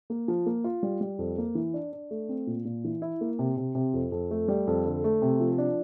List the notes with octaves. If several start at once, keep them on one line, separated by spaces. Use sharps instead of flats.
A#3
F3
A#3
F4
G3
G3
F2
A#3
E3
D4
D4
A3
C4
A#2
A#2
E3
E4
A#3
C3
C3
C3
F2
F2
A3
G3
F2
D3
A3
C3
F3
D4